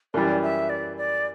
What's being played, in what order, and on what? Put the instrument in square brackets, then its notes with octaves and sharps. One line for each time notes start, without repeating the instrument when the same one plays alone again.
[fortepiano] F#2 E3 G3 [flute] D5
[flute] E5
D5
D5